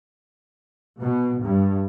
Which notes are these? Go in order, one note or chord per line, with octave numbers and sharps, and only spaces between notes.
B2
G2